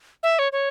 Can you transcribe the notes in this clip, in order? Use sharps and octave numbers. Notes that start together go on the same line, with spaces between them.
E5
C#5
C#5